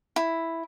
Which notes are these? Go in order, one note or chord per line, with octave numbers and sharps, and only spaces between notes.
E4